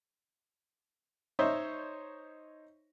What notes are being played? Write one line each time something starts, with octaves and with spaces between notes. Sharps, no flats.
D#4 C5 C#5 D#5 E5